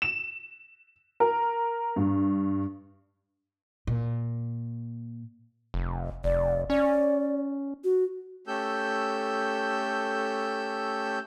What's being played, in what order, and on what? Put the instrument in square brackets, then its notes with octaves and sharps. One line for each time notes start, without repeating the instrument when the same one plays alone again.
[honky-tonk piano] E7
A#4
G2
[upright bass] A#2
[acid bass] F1
[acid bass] F1 [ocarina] D5
[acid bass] C#4 [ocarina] D5
[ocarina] F#4
[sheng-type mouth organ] A3 C#4 G4 A4 E6 G6